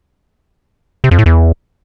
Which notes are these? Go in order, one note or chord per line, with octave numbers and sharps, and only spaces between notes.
C3
F2
A2
E2